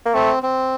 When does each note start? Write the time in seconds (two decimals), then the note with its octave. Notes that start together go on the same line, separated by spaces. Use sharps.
0.05 A#3
0.14 A3 C4
0.43 C4